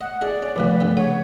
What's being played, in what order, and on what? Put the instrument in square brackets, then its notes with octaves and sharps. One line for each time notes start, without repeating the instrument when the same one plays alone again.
[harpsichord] D#5 [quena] F#5
[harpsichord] E4 G#4 D#5 [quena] D5
[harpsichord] C#4
[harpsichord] C2 B2 D#3 [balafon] F3 A3 [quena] B4
[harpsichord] G2 D3 B3
[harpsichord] C#3 [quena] C#5 [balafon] F#5